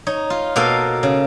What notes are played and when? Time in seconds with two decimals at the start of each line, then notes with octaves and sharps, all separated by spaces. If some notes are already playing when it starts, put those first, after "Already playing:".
0.06 D#4 C#5
0.30 F4
0.56 B2 A#3 A4 F5
1.03 C#3